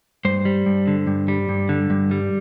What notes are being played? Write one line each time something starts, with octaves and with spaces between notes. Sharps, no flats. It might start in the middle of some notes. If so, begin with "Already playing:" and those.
G2 C5
G3
G2
D3
G2
G3
G2
D3
G2
G3